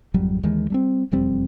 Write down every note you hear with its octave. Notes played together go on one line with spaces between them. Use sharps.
G#1 F2 F#3 G3
D#2 D#3 E3 G#3
G3 A3 C4
E1 F2 G3 C4